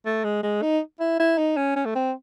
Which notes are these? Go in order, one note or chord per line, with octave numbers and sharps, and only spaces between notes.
A3
G#3
G#3
D#4
E4
E4
D#4
C#4
C#4
A3
C4